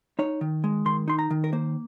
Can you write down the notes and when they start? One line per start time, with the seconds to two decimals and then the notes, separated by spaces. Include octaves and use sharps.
0.19 D#4 C#5
0.41 D#3
0.64 G#3
0.86 D#3 C6
1.08 D#4 C6
1.19 A#5
1.30 D#3
1.44 A#4
1.53 A#3 C5